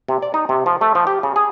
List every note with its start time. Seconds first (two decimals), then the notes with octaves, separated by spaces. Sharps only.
0.08 C3
0.22 D5
0.34 D#4
0.49 C3
0.66 F3
0.81 A3
0.95 F3
1.07 G4
1.23 C#3
1.36 G#4